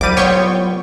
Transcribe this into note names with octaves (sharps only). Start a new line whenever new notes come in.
C2 F#3 G3 D6 D#7
B3 F4 C#5 G5 C#6